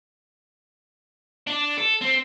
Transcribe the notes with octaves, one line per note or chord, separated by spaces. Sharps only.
D4
A4
C4